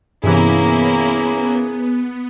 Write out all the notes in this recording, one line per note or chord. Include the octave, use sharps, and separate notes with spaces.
G2 C3 E3 A#3 B3 C#4 E4 G#4